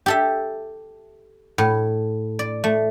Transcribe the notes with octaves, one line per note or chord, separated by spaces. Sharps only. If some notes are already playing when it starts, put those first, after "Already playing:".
G4 A4 E5
A2
D5
A3